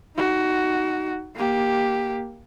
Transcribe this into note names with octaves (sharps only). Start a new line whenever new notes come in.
D#4 F#4
A#3 G4